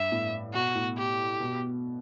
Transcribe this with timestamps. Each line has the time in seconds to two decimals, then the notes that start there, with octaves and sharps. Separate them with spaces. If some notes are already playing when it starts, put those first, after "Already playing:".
Already playing: G2 E5
0.12 A2
0.54 B2 F#4
0.75 A2
0.97 G4
1.40 B2